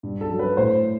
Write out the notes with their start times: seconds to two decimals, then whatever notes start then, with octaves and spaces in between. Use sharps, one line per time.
0.03 G2
0.21 A4
0.30 F#3
0.39 B4
0.57 A2 C5